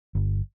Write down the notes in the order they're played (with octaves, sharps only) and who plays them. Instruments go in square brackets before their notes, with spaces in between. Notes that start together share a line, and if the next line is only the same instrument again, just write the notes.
[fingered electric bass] G1